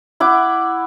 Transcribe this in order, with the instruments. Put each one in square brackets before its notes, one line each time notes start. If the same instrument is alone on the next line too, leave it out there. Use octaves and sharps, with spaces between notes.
[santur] E4 F#5 D6